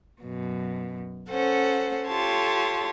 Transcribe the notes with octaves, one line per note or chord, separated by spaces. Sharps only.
F#2 B2
C#4 A4 C5 F#5
F4 G4 A4 C#5 A5 C6